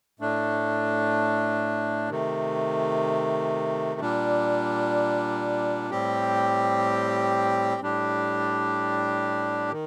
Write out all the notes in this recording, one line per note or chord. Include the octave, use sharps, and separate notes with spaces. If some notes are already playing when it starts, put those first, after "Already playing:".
A2 A3 D4
C3 D#3 A3
A#2 G3 D4
A2 G3 C4 G4
A2 G3 D4 G4
D#3